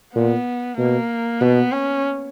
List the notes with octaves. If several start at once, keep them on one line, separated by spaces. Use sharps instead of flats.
A#2 B3
B2 A#3
B2 B3
C#4